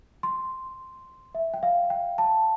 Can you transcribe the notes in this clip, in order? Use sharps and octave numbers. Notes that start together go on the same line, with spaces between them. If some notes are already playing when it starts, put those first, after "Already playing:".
C6
E5
G5
F5
G5
A5